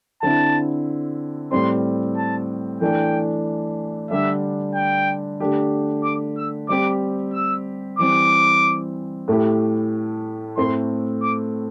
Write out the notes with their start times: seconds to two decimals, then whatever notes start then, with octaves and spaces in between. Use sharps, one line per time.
0.22 D3 C4 E4 A5
1.51 A2 G3 C4 C6
2.17 A5
2.81 E3 A3 D4 G5
4.11 D3 G3 D4 G4 E5
4.75 G5
5.40 D3 A3 D4 G4
6.04 D6
6.38 E6
6.69 G3 C4 G4 D6
7.33 E6
7.99 E3 G3 C4 D6
9.28 A2 A3 E4 G4
10.57 A2 A3 C4 E4 C6
11.23 D6